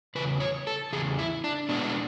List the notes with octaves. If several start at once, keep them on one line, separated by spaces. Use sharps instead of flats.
E2 C#3 B4
C#5
A4
E2 C#3 G#4
E4
D4
B2 G#3 B3 D4